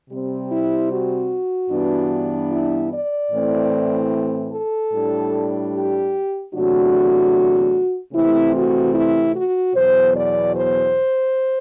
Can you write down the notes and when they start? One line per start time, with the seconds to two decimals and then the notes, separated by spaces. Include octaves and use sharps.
0.10 C3 G3 C4
0.50 E4
0.91 F#4
1.71 G2 E3 B3 D4
2.51 E4
2.91 D5
3.32 A2 E3 A3 C4
4.52 A4
4.92 A2 G3 D4
5.72 G4
6.53 E2 C3 F#3 A3 D4 F#4
8.13 C3 E3 A3 C4 E4
8.54 F#4
8.94 E4
9.34 F#4
9.74 E2 B2 F#3 C5
10.15 D5
10.54 C5